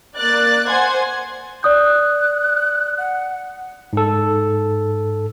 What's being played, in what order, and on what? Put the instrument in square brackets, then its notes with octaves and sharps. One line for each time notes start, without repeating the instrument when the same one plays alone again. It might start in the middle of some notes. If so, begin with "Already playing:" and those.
[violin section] A#3 D5 F#6 A6
C5 F#5 G#5 C6 G#6
[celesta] D5 D#6 G6 [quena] F#6
[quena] F#5
[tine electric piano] G#2 A4